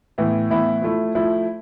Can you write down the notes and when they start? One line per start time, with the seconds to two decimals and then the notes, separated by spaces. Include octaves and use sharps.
0.18 A2 E3 B3 E4
0.50 A2 E3 B3 E4
0.82 F3 A3 E4
1.15 F3 A3 E4